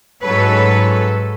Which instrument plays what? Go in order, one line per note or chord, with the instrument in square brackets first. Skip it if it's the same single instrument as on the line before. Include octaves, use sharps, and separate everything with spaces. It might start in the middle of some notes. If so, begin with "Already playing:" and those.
[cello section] G#2 F#3 C#4 A4 B4 C#5